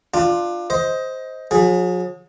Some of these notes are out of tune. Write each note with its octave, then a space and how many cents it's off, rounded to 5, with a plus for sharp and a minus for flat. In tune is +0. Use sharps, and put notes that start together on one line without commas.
D4 +25 F4 +0
C5 +0 D#5 +20
F#3 -45 G#4 +0